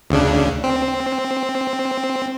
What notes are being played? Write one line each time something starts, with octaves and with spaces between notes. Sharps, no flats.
D2 C#3 D4
C4